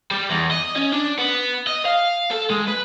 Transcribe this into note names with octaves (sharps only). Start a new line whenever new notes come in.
G3
E2
D#5
C#4
D4
B3
D#5
F5
A4
G#3
B4